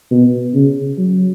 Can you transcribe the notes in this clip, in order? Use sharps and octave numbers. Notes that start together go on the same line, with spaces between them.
B2
C#3
F#3